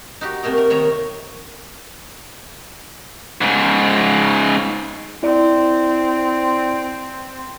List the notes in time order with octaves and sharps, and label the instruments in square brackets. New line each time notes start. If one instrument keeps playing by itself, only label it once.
[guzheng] D#4 F#4 G4
C3 A3 A#3 A#4 D#5
A#4
D#3 C#5 D#5 E5 A#5
[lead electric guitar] G#2 C#3
[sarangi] C4 [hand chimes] E4 D5